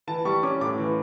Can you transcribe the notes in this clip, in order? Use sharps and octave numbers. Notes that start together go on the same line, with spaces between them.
E3 A5
G3 C#6
C#4 D6
A2 D6
E3